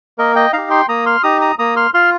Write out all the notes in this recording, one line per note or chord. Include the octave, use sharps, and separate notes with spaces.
A#3 A#4 D#5
D#5 G5
D#4 G4 F5 A#5
G5 C6
A#3 A#5 D#6
C6 F6
D#4 G4 A#5 D#6
A#5 D#6
A#3 A#5 D#6
C6 F6
F4 C6 F6